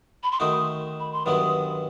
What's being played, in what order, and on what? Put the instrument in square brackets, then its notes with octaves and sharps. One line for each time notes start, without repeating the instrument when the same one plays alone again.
[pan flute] B5
C6
[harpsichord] D#3 A3 D#4 F#4 [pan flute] D#6
[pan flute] B5
C6
[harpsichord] G2 D#3 F#3 B3 E4 [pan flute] D#6